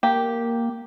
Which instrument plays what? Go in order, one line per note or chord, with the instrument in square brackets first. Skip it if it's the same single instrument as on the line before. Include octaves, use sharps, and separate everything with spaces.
[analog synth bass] A#3 [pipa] G4